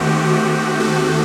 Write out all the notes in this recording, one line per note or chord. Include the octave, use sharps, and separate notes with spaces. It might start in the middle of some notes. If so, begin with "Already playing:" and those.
Already playing: D#2 D#3 A3 C4 F#4 G4
G4
A4